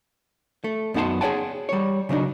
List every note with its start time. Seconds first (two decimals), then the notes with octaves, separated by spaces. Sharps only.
0.64 A3
0.94 F#2 B3 D#4 F#5 A5 C6
1.21 G#4 C5 C#5 F#5 G5 A5
1.69 G3 C#5
2.09 C#3 F#3 D4 D#4